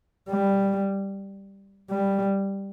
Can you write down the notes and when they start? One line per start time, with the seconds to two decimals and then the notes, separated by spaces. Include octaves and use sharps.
0.30 G3
1.91 G3